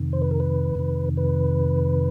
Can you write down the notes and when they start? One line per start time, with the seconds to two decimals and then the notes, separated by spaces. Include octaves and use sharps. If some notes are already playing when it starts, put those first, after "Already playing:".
Already playing: F2 C3 D#3
0.13 C5
0.22 B4
0.31 A#4
0.40 B4
0.75 F2 C3 D#3
1.17 B4